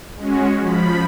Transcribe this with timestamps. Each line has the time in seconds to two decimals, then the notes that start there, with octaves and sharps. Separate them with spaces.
0.17 G#3 C#4 F#4
0.61 F3 B5